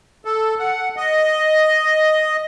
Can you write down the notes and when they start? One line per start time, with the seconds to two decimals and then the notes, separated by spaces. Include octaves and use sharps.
0.25 A4
0.59 F#5
0.97 D#5